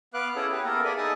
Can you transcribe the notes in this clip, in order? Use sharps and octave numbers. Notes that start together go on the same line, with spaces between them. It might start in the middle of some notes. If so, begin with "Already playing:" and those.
B3 B4 F5 D6 F#6
C#4 E4 G#4 A4
G4 B4
A#3 B3 A4 A#4
G#4 A4 D5 E5 G#5
D#4 G#4 A4 G#5 A5